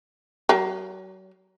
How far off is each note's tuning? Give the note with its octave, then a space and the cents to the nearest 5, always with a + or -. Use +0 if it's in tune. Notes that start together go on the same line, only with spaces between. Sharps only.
F#3 +35 A#4 -10